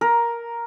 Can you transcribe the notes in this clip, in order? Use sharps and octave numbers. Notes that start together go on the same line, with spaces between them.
A#4